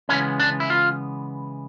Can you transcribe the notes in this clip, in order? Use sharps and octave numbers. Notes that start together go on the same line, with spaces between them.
C#3 E3 G#3 B3 C#4
D4
E4
F4